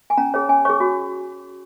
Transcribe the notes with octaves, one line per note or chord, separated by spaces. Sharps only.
G#5
C#4 A#5
G#4 C#5
C#4 G#5
G#4 C#5 C#6
F#4